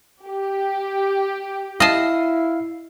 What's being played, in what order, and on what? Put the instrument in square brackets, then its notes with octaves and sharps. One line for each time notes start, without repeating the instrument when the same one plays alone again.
[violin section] G4
[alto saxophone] E4 [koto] D#5 A5 [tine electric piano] F5 C7